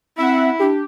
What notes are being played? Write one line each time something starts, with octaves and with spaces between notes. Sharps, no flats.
C4 E4 E5 F#5
D4 G4